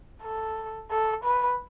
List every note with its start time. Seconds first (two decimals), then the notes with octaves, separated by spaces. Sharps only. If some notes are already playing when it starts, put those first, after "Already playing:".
0.23 A4
0.91 A4
1.24 B4